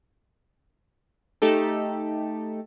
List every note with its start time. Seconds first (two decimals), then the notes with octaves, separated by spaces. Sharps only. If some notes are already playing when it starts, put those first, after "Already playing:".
1.42 A3 D#4 G4 A4